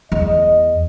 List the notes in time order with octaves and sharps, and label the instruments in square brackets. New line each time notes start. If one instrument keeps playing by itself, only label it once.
[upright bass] E2 [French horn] D#5